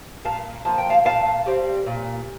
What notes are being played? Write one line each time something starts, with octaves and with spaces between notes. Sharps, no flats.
A#2 F5 A5
F3 A#3 A5
G5
F5 A5
A#2 F5 A5
G3 C4
A#2